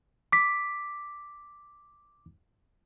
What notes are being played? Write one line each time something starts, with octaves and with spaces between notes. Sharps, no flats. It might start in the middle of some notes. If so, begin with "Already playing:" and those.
D6 B6